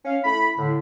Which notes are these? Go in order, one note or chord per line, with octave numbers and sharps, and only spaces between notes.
C#4 F5
A3 E4 B5
A2 D3